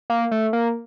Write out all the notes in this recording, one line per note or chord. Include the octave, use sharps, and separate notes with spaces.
A#3
A3
A#3